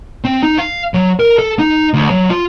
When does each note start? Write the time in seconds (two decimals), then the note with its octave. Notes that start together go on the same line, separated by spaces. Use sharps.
0.24 C4
0.43 D#4
0.59 F5
0.94 F#3
1.20 A#4
1.39 A4
1.59 D#4
1.94 D2
2.11 F#3
2.30 F4